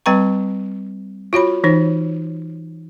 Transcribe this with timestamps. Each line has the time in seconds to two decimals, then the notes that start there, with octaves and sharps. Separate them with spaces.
0.06 G3 C4 B4 G5 A#5 C#6
1.33 F4 F#4 C#5 B5
1.64 E3 D#4 C5